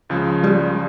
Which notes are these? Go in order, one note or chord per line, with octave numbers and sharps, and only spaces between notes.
C#2 C#3 F3 G#3
G3